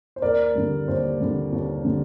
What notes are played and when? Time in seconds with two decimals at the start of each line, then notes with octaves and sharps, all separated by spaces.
0.16 C5
0.22 D#2 A#4 D5
0.55 D3 G3
0.88 D#2 C5
1.20 D3 G3
1.52 D#2
1.84 D3 G3